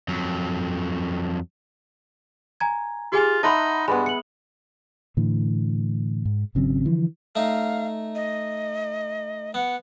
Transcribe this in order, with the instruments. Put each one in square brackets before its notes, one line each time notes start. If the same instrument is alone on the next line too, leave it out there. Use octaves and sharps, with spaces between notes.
[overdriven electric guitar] F2 F#3
[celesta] G#5 A#5 G#6
[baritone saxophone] F4 [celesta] G4 G#4 G#5
[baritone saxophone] D#4 [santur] E5 F#5 B5 [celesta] A5 C6
[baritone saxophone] G2 [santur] G#3 B3 [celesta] B5
[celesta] C#7 F#7
[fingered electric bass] A2 D3 E3
G#2
G#1 C#3 F#3 C4
D3 E3 F3
[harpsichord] A3 D#4 [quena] F5
[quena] D#5
[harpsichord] B3 [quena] F#5